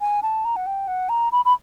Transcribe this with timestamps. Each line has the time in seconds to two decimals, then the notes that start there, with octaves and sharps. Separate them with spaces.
0.01 G#5
0.23 A5
0.45 A#5
0.56 F#5
0.67 G5
0.88 F#5
1.09 A#5
1.32 B5
1.45 B5